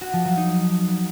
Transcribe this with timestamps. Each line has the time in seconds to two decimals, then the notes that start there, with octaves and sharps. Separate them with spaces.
0.01 F#4
0.13 F3
0.25 F#3
0.37 D#4